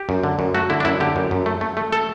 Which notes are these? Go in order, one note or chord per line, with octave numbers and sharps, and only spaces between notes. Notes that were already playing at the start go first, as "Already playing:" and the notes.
Already playing: G4
F#2
D3
F#2
A3 F#4
D3 E4
D4
F#2 E4
D3 G4
F#2
F#2
A3
A3
A3
A4